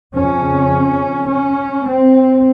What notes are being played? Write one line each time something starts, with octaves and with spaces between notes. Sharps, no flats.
F2 C#3 C#4
C#4
C4